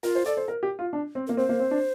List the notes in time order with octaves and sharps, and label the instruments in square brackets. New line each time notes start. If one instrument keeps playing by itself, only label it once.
[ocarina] F4 [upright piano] A#4
[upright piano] C5
[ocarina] A4 [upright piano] D5
[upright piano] C5
A#4
G4
F4
D4
C4
[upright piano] A#3 [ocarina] A#4
[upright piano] C4 [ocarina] C5
[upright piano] A#3
C4
D4